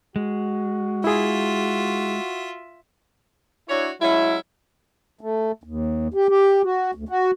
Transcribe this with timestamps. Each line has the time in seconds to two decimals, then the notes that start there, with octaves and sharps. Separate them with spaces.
0.16 G#3 F#4
1.04 E4 F4 G#4 E5
3.69 D4 E4 F#4 C#5
4.01 F#3 G#3 C#4 E4
5.21 A3
5.64 D#2
6.14 G4
6.29 G4
6.64 F#4
6.95 D2
7.09 F#4